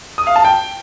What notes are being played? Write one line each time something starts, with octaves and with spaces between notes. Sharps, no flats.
D#6
F5
A5
G5